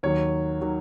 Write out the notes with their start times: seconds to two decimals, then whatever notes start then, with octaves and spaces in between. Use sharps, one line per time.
0.03 D#2 D#3 F#3 C#5
0.61 D#3 F#3